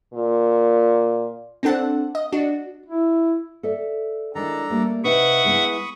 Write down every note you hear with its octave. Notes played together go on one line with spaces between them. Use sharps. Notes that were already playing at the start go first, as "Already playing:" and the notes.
A#2
C4 D4 A4 F#5 A5
D#5
D4 F#4
E4
A4 D5 E5
D#3 G#3 D4 E4 A4 A#5
G3 A3 A#3
C3 D#4 B4 E5 F#5 B5 C#6 D#6
G#3 B3 E4